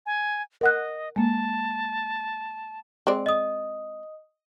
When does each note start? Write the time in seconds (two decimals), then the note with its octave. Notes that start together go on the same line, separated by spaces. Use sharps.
0.06 G#5
0.61 A#4 D#5 F#5 F#6
1.16 G#3 A#3 A5
3.07 G#3 C4 D5
3.26 D#5 D#6